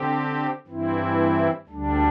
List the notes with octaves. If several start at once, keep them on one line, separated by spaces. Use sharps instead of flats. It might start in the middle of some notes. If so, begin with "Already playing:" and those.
Already playing: D3 C4 G4
G2 E3 C4 E4
D2 D3 G3 D4